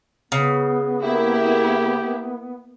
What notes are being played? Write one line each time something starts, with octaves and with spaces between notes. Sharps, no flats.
C#3 B3
A#3 E4 G4